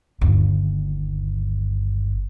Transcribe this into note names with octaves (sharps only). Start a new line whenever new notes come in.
G1 D#2